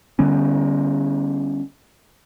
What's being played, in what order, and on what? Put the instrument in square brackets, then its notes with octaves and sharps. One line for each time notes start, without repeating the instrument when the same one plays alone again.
[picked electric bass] D3 G3 B3 C#4